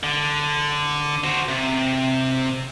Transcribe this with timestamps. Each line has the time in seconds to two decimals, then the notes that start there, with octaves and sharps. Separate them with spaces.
0.03 D3
1.24 F#4 C5
1.49 C3